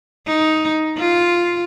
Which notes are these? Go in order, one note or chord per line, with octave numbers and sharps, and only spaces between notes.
D#4
F4